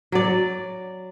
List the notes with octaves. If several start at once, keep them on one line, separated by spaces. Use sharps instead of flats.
F#3 D5